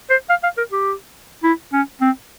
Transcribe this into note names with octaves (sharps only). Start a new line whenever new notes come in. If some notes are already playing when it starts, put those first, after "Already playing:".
C5
F5
F5
A#4
G4
E4
C#4
C4